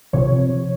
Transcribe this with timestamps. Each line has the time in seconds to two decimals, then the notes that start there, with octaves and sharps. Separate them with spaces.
0.13 C3 F3 C#5